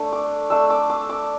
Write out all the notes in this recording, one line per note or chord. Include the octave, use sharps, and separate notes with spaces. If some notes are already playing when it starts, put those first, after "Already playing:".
Already playing: A3 D4
D6
A3 D4 E6
D6
D6
D6